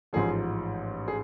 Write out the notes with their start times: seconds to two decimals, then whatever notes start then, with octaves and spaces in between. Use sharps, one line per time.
0.13 A1 G#2 F3 G#4
1.08 G#4